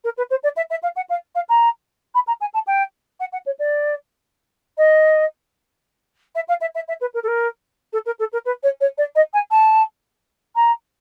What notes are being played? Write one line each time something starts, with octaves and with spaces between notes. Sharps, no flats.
A#4
B4
C5
D5
E5
E5
F5
F#5
F5
F5
A#5
B5
A#5
G#5
A5
G5
F#5
F#5
C#5
D5
D#5
E5
F5
E5
E5
E5
B4
A#4
A4
A#4
A4
A#4
A4
A#4
B4
C#5
C#5
D5
D#5
G#5
A5
A#5